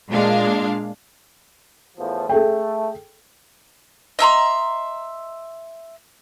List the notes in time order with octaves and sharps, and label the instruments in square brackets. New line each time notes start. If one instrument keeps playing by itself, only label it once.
[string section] A#2 G#3 D4 F5
[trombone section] E2 A2 F3
[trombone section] A3 [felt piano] G#4 A4 G5
[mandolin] D#5 E5 A#5 C6